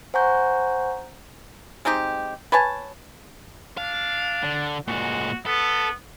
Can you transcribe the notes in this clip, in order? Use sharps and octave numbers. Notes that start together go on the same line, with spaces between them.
C5 F#5 G#5 A#5 C#6 G6
G#3 C4 D#4 G4
B4 C#5 G#5 A5
D4 F5
D3
A#2 G#3 F#4
B3 A4